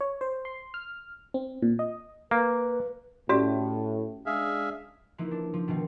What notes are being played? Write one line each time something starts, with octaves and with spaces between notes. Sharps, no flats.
C#5
C5
C6
F6
C4
A#2
D#5
A#3 B4
A2 C#4 F#4 G4 D5
G#3 D4 G#4 E5 F5
E3 F3 A#3 D#4 E4
D4
F3
B2 D#3 C4 D#4